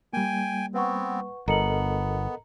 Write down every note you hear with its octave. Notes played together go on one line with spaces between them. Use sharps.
G3 A#3 G5 G#5
B3 C4 B4 F#5 C#6
G1 B3 A4 A#4 D#5 A#5 C#7 F#7